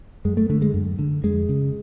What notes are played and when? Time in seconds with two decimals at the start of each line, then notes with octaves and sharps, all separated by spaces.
0.25 F#2 G#3
0.37 A3
0.50 D3 A3
0.62 G#3
0.74 F#2
0.99 D3
1.23 F2 G#3
1.49 C#3